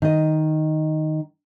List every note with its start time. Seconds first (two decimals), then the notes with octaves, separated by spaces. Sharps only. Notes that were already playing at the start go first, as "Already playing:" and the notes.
0.02 D#3 D#5